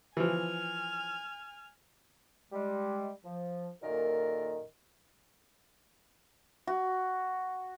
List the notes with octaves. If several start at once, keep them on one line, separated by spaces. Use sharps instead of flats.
E3 F3 G#5 F6
G3 G#3
F3
F#2 A#2 D#3 A#3 A4 A#4
F#4